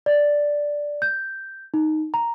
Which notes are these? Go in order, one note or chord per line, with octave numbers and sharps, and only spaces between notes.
D5
G6
D#4
A#5